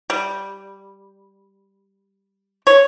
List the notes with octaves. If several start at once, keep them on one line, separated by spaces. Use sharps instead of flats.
G3
C#5